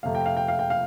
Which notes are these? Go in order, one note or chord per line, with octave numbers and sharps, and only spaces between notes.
F2 C3 A3 F5
G5
F5
G5
F5
G5
F5